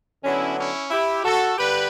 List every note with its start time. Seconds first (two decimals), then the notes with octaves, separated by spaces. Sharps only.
0.24 D3 F#3 B3 C#4 E4
0.57 C#4 E4
0.91 E4 G4
1.24 F#4 A4
1.57 G2 D3 G4 B4